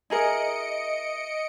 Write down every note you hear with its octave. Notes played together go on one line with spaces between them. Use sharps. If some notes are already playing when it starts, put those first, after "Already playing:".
E4 G#4 A#4 D#5 C#7 D7